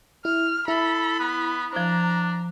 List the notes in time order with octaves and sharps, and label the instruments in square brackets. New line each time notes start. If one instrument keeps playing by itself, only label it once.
[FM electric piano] E4 [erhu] F6
[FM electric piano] E4 [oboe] A4 [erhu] B5
[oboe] B3
[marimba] F3 C5 [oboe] D4 [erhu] A#5